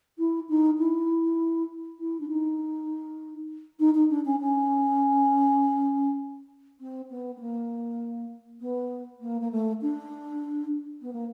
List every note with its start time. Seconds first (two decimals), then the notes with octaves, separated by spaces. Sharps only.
0.19 E4
0.49 D#4
0.78 E4
2.00 E4
2.20 D4
2.29 D#4
3.80 D#4
3.95 D#4
4.10 D4
4.25 C#4
4.40 C#4
6.81 C4
7.10 B3
7.37 B3
7.40 A#3
8.61 B3
9.21 A#3
9.41 A#3
9.51 A3
9.82 D4
11.02 B3
11.13 A#3